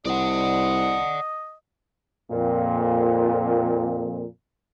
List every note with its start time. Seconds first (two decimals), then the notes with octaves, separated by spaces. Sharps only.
0.06 C2 D5 D#5 F#5
2.31 F2 A#2